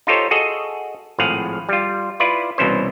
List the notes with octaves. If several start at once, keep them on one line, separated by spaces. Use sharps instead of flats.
D#4 F4 G4 A4 C5 C#5
F#4 G#4 A4 D#5
G#1 A2 F3 G#4 F5 F#5
G3 F4
E4 F4 B4 D5
C2 B2 E3 C#4 C5